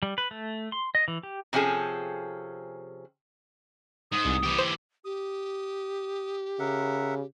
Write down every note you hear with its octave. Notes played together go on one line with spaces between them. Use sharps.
G3
B4
A3
C6
D#5
E3
G4
C3 F3 C#4 F#4 G#4 A4
G#2 D#6
C2
E3 G4
C5
G4 D#6
C#3 A#4 E5 F#5